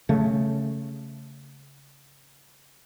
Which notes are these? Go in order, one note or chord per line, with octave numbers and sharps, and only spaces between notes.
C#3 A3